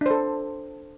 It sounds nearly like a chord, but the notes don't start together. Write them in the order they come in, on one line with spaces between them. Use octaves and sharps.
D4 C5 A4